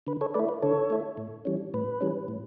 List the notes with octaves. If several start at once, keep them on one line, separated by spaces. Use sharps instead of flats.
D3 B4
A4 C#5
A3 B4 D5
E4
B4
D3 A4 C#5
A3 E4
A2
E3 G3 C#4
A2 B4
E3 G3 C#4
A2